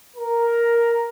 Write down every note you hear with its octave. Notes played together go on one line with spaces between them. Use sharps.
A#4